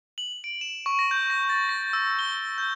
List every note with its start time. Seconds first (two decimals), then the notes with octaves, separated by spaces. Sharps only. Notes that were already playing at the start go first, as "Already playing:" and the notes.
0.18 F#7
0.44 D7
0.61 E7
0.86 C#6
0.99 A#6
1.11 G6
1.30 A#6
1.49 A6
1.69 A#6
1.93 E6
2.19 G7
2.58 G6